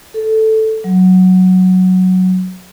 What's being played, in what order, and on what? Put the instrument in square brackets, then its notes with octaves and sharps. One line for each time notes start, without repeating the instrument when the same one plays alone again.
[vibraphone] A4
F#3